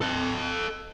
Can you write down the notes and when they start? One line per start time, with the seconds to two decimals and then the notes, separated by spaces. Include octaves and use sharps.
0.01 A4 D#5